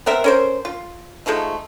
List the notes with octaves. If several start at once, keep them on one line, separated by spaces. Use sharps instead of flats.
B3 C4 A#4 E5
C#4 A#4 C5
F4
F3 G#3 A3 D#4